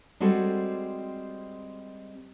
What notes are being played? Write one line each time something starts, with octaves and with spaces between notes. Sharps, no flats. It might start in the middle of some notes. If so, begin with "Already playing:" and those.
G3 G#3 C4 F#4 G4 A4